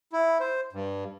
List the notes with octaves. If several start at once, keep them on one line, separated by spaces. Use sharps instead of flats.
E4
C5
G2